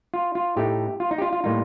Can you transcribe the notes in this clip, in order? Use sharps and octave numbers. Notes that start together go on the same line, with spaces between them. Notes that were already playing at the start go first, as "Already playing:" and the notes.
F4
F4
A2 A3 D#4 G4
F4
D#4
G4
F4
F4
A2 G3 A#3 D#4 F4